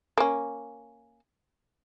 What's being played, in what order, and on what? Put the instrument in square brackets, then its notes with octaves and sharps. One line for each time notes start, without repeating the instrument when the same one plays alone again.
[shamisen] A#3 C#4